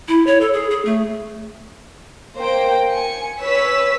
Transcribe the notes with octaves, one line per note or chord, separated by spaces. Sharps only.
E4
C#5
A4
G#4
G#4
A3
A#3 C5 G5
G#5 C#7
B4 C#5 E6 B6